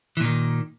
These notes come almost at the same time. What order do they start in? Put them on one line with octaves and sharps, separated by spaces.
E3 A#2 D#3